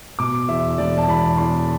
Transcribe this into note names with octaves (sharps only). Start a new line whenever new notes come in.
B2 D6
E2 E5
E1 D5
A5
E2 B5
E2 C6